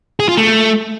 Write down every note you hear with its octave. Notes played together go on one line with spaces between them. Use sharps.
G#4
F4
A3